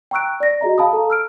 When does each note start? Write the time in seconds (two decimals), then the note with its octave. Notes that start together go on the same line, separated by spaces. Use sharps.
0.11 G5 A#5 C#6 E6 F#6 D7
0.40 D5 A#6
0.61 F#4 G#4 D#5 A#5
0.78 F5 A5 B5 D#6
0.93 A4 A#5
1.10 E6 F6 D7